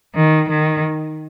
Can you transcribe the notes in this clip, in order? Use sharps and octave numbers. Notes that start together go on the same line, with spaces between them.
D#3
D#3